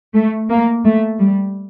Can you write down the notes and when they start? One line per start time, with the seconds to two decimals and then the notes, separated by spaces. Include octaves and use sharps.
0.14 A3
0.50 A#3
0.85 A3
1.19 G3